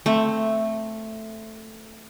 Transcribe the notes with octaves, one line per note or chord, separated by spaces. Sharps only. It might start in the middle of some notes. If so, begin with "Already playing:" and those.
A3 C4